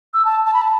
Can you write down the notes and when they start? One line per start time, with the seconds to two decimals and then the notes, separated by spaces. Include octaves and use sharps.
0.14 E6
0.25 A5
0.46 A5
0.54 B5
0.62 A5